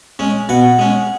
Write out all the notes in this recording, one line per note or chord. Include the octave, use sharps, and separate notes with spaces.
G#3 C#4
B2 F#5
G#3 C#4